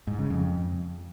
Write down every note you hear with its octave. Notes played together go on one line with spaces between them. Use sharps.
G#2
C#3
F2